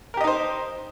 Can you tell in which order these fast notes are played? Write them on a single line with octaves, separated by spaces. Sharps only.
A#4 G4 D#5 D#4 C5